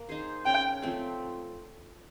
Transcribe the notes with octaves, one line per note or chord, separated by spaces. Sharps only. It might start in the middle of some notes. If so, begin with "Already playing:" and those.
Already playing: A#3
D#4 G#4 C5
C#3 G5
F3 A3 C4